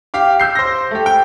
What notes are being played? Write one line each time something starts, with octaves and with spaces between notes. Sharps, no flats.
G4 F5 D6
E6 G6 C7
C5 A#6
A3 G4
G5